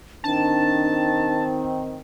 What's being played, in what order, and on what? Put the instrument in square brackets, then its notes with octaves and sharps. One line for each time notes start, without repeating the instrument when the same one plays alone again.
[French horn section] D#3 C4 [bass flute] D4 [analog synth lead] A5